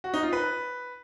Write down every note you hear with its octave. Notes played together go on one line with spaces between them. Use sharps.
F#4
D#4
F4
B4